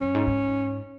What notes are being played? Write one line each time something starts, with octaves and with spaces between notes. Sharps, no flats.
F#2 C#4
G#2
G#2